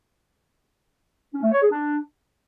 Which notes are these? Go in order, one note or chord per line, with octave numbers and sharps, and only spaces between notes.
C#4
A3
C#5
G#4
D4